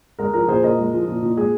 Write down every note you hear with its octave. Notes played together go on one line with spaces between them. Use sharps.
G#3 A#4
F3 A#4
A#2 G#4 C5
A#2 A#4 D#5
G#3
F3
A#2
A#2
G#3 G#4